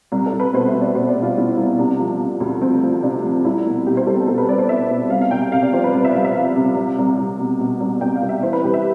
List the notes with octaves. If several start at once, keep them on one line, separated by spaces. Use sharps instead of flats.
C2
A4
C2
B4
B2 C5
E5
B2
D5
B2 C5
D5
B2
F4
B2 E4
C2
C3 D4
F3
C3
D2
F3 C4
F3
C3 D4
F3
C2 E4
B2
B2 G4
C5
C2 A4
G4
B2 A4
B4
C2 D5
C5
C2 E5
B2
C2 F5
F5
C2 G5
G5
C3 F5
D5
F3 C5
B4
C2 D5
E5
C2 F5
E5
F3 F5
C3
C2
C2
C2
B2
B2
C2
C2 G5
F5
C2
E5
E3 C5
B4
C2 G4
E5